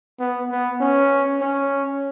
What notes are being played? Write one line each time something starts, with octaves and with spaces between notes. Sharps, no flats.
B3
B3
C#4
C#4